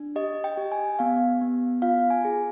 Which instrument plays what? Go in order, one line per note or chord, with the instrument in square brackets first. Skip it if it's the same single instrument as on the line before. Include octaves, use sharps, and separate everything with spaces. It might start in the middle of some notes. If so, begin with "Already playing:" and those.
Already playing: [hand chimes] D4
G4 D#5
G5
G4
G#5
B3 F5
B3
F4 F5
G#5
G#4